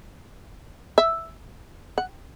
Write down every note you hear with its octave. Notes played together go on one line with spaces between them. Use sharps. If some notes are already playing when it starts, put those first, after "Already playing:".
E5
F#5